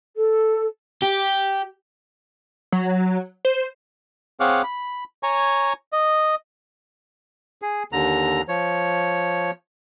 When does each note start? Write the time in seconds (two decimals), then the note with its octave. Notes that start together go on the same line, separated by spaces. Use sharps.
0.16 A4
1.03 G4
2.72 F#3
3.45 C5
4.40 C4 G#4 C#5 F5 F#5 D6
4.64 B5
5.23 C#5 G#5 A#5 C#6
5.93 D#5
7.62 G#4
7.92 D#2 D3 A#5
8.48 F3 C#5